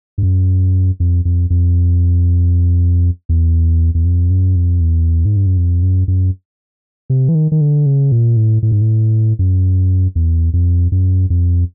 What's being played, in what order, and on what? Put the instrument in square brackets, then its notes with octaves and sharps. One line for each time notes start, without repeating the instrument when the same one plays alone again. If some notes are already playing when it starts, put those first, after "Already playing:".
[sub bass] G2
F#2
F2
F2
F2
E2
E2
F2
F#2
F2
E2
G#2
G2
F#2
F2
F#2
F#2
C3
E3
D#3
D#3
D3
C#3
A#2
A2
A2
G#2
A2
F#2
E2
F2
F#2
F2